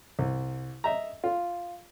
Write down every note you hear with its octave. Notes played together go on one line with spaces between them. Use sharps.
C2
D#5 E5 A#5
F4